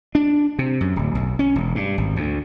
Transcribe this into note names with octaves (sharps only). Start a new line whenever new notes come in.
D4
C3
F#2
D1
B1
C#4
E1
G2
G#1
D2